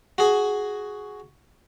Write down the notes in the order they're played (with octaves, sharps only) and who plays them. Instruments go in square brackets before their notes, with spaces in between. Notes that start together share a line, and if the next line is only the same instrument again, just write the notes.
[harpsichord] F#4 G#4